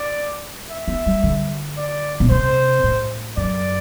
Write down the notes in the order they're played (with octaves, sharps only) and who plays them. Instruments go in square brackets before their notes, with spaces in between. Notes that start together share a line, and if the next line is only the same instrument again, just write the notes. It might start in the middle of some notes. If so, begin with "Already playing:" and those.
Already playing: [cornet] D5
E5
[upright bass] B3
G3
D3
[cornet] D5
[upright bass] B2
[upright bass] C3 [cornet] C5
[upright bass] A2
[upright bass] F#2 [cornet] D5